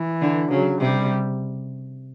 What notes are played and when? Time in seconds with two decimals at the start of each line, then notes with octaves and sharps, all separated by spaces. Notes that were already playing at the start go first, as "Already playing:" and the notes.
Already playing: E3
0.21 D3
0.51 C#3 F#3
0.81 C3 G3